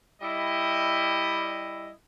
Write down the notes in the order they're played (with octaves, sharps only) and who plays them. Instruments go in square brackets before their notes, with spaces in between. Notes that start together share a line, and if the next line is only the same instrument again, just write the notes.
[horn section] G3 E4 D#5